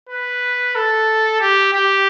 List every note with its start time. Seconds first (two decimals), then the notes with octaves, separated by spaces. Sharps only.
0.09 B4
0.75 A4
1.40 G4
1.73 G4